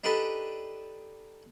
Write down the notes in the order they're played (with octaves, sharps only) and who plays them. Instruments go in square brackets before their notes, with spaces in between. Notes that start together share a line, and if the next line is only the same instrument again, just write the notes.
[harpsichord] D4 D#4 G4 A4 B4